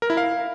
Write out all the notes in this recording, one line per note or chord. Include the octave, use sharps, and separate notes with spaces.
A#4
E4
F5